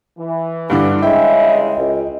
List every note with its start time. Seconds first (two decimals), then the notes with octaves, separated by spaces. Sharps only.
0.18 E3
0.70 G2 D3 D4 E4
1.03 G2 C#3 G#3 E4 D#5 G5
1.78 C#2